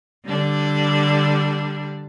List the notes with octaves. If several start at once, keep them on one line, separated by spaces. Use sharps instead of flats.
D3 G3 D4